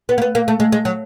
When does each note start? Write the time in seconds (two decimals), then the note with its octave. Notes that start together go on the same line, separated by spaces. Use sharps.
0.09 B3
0.18 A#3
0.22 B3
0.35 A#3
0.48 A3
0.60 G#3
0.72 G#3
0.85 F#3